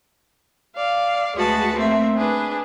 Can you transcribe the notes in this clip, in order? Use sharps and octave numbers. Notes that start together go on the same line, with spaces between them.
D5 F5
D2 G#3 F#4 G#4 B4 A5
A3 A#3 C4 E5
D4 G#4 B4